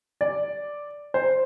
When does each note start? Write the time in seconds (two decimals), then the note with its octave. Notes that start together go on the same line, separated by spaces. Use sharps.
0.21 D5
1.14 C5